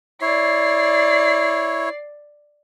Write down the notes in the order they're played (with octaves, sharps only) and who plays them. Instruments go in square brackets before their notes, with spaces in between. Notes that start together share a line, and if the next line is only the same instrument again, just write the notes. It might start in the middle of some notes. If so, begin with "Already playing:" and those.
[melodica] E4 C#5 [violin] D5 C7